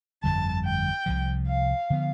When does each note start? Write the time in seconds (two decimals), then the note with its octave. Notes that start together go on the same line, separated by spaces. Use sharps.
0.23 G1 F2 D3 G3 A5
0.65 G5
1.06 C2 C3 F3
1.47 F5
1.90 D3 F3 B3